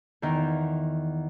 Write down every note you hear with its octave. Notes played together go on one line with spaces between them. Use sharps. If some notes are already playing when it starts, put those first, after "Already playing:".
E2 D#3